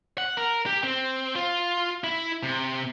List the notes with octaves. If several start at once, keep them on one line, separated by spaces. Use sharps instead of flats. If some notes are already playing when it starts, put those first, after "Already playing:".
F#5
A#4
G4
C4
F4
E4
C3